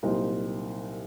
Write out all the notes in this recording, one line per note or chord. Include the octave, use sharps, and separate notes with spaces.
C2 A#2 F#3 C4 D#4